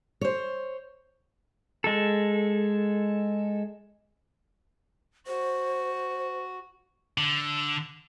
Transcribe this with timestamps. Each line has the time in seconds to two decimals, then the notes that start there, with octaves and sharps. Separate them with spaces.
0.21 C5 C#5
1.84 G#3 A4
5.27 F#4 C5
7.18 D3